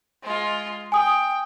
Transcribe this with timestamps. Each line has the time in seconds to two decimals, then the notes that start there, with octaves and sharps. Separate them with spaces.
0.23 G#3 F4
0.92 G5 G#5 D#6